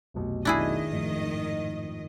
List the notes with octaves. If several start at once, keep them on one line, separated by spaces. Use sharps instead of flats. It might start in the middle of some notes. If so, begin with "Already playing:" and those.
F1 B1
G#1 D#3 D4 E4 G#4 D#5
F2 A2